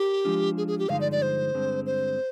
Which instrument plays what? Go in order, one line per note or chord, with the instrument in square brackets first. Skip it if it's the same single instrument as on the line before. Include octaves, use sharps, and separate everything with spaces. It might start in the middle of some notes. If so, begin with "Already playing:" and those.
Already playing: [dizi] G4 [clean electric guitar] A#4
[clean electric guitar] F3 G#3 D4 F4
[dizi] G#4
G#4
G4
[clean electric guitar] G2 D3 F3 G#3 D#4 [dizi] F5
[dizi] D5
D5
C5
[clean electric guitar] G2 D3 G#3 C4
[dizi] C5